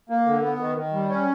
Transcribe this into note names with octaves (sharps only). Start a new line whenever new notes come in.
A#3
D3
B3
D#3
D#3
G3
C#4